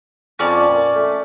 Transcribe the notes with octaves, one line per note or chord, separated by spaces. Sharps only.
F2 C#4 D5 A5
A#2
A3